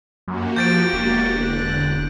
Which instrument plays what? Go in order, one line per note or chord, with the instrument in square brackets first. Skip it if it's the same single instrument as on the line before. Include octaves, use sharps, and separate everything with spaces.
[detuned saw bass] F#2 [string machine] A#3 F#4 G4
[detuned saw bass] F3 [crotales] G6 A6 D7
[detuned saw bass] E1
[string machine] D3 F#6